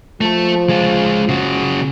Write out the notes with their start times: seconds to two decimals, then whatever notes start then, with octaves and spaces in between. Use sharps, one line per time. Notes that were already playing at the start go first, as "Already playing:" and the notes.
0.21 F3 A3 A4
0.69 G#3 F4
1.29 C#3 F#4